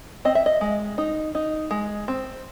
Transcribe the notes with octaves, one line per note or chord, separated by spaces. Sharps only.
C4 D#5
E5
D#5
G#3
D#4
D#4
G#3
C4